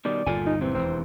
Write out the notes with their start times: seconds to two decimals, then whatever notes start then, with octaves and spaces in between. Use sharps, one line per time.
0.05 B2 D#3 G3 D5
0.27 G1 D#2 A#2 F4 A4 G#5
0.46 D#4
0.61 C3 E3 C4
0.75 E1 D#2 C4